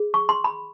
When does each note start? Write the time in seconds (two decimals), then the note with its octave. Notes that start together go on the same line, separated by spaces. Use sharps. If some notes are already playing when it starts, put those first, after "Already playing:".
Already playing: G#4
0.14 C#6
0.29 C6
0.44 B5